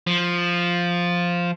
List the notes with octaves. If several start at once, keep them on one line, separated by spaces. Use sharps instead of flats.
F3